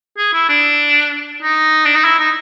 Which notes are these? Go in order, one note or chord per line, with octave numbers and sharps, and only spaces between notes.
G#4
E4
D4
D#4
D4
D#4
E4
D#4